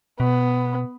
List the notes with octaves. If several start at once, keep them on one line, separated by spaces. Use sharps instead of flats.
B2 B3